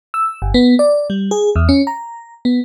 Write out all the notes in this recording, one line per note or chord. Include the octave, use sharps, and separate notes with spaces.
E6
G1
B3
D5
G3
G#4
E2
C#4
A#5
B3